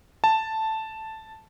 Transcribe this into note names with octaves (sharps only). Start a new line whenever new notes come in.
A5